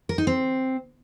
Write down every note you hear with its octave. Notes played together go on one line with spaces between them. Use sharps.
A#4
D#4
C4